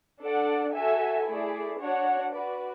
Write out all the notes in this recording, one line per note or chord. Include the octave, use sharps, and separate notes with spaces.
D4 A4 D5 F#5
F#4 A4 E5 G#5
A3 E4 G#4 D5
D4 F#4 C#5 F#5
F#4 B4 D5